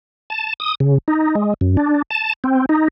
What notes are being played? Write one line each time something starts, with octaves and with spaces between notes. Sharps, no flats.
A5
D#6
C#3
D#4
G#3
F#2
D4
A5
C4
D#4